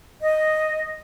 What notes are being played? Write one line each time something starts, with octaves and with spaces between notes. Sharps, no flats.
D#5